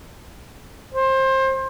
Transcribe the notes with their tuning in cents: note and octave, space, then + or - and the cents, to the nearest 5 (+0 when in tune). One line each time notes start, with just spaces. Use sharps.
C5 +25